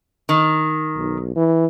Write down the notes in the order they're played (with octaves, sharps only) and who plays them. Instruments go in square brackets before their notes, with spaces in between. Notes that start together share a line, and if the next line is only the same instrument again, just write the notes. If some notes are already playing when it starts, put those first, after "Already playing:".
[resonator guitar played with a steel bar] D#3
[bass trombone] B1
E3